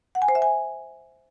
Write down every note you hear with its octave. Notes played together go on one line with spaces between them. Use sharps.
F#5
G#5
C5
E5
G#5